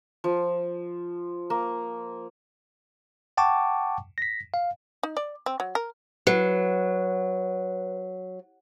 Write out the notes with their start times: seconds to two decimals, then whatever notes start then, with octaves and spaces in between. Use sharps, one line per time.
0.24 F3
1.50 A#3
3.37 F#5 G5 A5 C#6 D6
4.18 A#6 B6
4.54 F5
5.03 D#4
5.17 D5
5.46 C4
5.60 F#3
5.75 A#4
6.27 F#3 B4